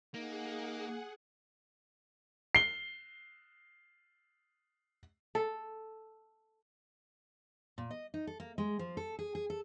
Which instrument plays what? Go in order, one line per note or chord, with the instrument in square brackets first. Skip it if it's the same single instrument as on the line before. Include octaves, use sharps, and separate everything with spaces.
[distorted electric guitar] A#3 [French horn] D#4 [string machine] G#4 F#5
[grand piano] C7 G7
[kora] A4
[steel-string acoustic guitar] A#2
D#5
D#4
A4
A#3
G#3
F3
A4
G#4
G#4
A4